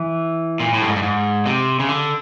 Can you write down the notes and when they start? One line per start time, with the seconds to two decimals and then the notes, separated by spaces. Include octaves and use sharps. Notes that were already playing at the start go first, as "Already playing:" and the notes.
Already playing: E3
0.60 A#2
0.74 A2
0.82 G2
0.88 G#2
0.96 G2
1.03 G#2
1.46 C3
1.80 C#3
1.89 D3